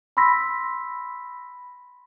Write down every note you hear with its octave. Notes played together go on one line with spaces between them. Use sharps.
B5 C6 E6 A#6 B6